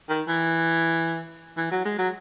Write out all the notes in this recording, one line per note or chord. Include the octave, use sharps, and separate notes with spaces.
D#3
E3
E3
F#3
G#3
F#3